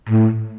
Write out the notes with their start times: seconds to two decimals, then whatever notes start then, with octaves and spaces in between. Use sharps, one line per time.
0.09 A2